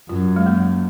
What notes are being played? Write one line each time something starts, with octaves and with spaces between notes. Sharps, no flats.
F#2 F4
G#3
A#3